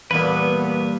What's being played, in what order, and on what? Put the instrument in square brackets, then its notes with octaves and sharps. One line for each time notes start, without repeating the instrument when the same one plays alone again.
[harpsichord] E2 A#2 [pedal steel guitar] G3 A#3 B4 [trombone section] B3